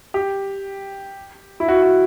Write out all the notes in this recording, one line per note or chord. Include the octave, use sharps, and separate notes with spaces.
G4
E4
F#4
F#4